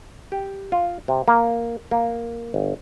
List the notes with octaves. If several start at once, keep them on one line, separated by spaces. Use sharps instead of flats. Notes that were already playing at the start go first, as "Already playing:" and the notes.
G4
F4
C3
A#3
A#3
G1